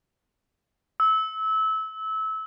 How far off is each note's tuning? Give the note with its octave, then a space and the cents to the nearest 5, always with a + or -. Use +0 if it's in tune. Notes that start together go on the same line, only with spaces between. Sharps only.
E6 -25